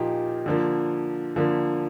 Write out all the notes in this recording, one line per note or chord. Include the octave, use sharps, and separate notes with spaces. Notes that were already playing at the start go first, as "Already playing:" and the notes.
Already playing: A#2 F3 A#3 D#4 G4
D3 F3 A#3
D3 F3 A#3